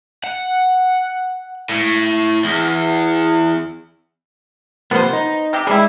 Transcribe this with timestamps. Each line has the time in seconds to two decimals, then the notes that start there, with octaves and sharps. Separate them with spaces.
0.24 F#5
1.69 A2
2.44 E2
4.91 C3 F3 A#3 B3 C5
5.13 D#4
5.53 C3 G4
5.67 G3 G#3 E4 G#4